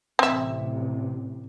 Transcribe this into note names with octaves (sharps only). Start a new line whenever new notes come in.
A1 C3 C4 E5